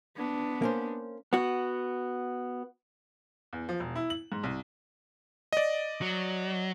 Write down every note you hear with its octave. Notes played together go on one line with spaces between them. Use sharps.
B3 D4
A#3 C#4 C5
B3 F#4
E2
F3
E1
E4
F#7
G#2
C2
D5 D#5
F#3